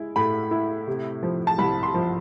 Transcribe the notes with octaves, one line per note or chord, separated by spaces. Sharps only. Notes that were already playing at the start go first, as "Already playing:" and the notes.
Already playing: G#3 E4
A2 B5
E4
C3
F3
A5
C2 B5
C6
F3